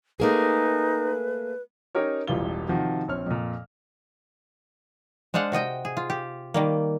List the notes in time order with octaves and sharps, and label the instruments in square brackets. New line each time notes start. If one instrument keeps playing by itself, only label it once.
[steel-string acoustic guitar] A3 A#3 G#4 [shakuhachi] D#4 [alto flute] B4
[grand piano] C#4 D#4 G4 A#4 C#5
E1 A1 E3 G3 F4 G7
C3 D#3 F3 F#4
A#1 C4 C#5 F6
F2 A#2
[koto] G#3 D4 C5 F5 F#5
C3 F#4 D#5 G5
G#4
F4
G4
D#3 G3 A#3